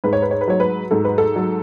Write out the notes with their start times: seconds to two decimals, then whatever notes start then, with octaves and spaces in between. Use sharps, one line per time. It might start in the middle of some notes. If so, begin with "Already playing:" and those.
0.04 G#2 B4
0.13 C#5
0.22 B4
0.31 C#5
0.41 B4
0.48 F#3 C#5
0.60 B4
0.91 G#2 A4
1.05 B4
1.18 A4
1.36 F#3